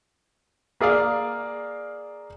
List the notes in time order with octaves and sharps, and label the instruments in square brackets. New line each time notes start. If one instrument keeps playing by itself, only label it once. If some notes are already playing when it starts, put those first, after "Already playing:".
[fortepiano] A#3 G#4 D5 F5